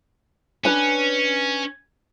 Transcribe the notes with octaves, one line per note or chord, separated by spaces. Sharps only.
C#4 D4 B4 G#5